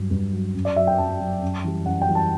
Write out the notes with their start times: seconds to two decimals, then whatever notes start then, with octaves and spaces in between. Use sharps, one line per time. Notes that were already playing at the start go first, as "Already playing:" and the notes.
Already playing: G2 F#3
0.11 G2
0.32 F#3
0.54 F#2
0.65 D5
0.76 F#3 E5
0.87 G5
0.98 F#2 A5
1.20 F#3
1.42 F#2
1.64 E3 G3
1.86 F#2 F#5
2.02 G5
2.08 E3 G3
2.15 A5